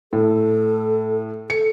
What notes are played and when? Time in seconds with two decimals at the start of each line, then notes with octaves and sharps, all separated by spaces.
0.13 A2 A4
1.50 A4 C#7